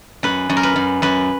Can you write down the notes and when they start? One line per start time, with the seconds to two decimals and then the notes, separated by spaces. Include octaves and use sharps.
0.23 F#2 B4
0.49 F#2
0.57 A#4
0.63 B4
0.76 F#2
1.02 F#2 B4